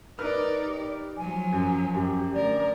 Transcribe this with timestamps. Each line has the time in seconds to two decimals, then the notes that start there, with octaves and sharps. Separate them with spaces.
0.19 D#4 A#4 B4 D5 F6
0.66 G4
1.17 F3 F#3 G#5
1.53 F#2
1.94 F#2 G4
2.34 D2 A#4 D5